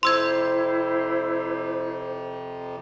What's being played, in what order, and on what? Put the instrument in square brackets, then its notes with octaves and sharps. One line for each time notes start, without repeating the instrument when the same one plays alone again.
[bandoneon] F2 C3 [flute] E4 [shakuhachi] C5 [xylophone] C6 E6 G#6